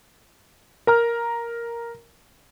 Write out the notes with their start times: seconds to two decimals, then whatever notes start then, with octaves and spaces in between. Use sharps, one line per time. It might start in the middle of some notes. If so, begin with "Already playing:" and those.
0.87 A#4 A#5 F6